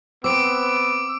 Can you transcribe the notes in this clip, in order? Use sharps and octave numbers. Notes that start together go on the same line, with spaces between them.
B3 C4 D6 E6 D7